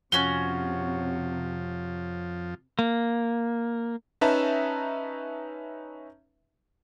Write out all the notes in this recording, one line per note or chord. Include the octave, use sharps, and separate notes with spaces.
F2 C3 F3 C#4 F#4 G7
A#3
C#4 D#4 B4 E5 A5 A#5